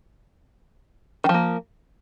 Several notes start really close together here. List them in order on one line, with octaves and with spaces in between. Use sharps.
D#3 F3 A#3